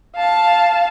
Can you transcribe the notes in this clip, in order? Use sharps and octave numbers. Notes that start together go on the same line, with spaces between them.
F5 A5